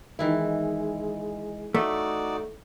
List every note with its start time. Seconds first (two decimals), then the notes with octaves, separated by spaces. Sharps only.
0.19 D#3 E3 G#3 E4
1.74 A3 D#4 F#4 D5